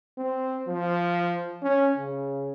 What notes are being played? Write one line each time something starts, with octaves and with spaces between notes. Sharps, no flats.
C4
F3
C#4
C#3